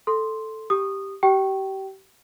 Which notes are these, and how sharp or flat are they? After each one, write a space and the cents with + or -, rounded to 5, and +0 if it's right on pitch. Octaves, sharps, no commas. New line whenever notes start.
A4 +0 C6 +0
G4 +0 D#6 -15
G4 -30 G5 -25